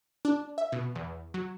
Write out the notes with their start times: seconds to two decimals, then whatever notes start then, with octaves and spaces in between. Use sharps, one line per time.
0.25 D4
0.58 E5
0.72 B2
0.95 E2
1.34 F#3